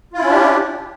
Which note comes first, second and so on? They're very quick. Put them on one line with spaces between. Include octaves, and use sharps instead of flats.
F4 E4 C#4 D4 G4